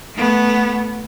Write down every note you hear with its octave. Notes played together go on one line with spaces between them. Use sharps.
A3 B3